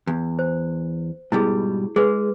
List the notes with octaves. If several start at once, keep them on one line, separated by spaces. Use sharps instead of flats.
E2
C5
G#2 B2 G3 E4 G#4
G#3 G#4 B4